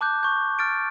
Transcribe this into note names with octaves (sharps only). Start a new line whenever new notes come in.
A5 D6 F#6 G6
C#6 G6
F6 A6 D7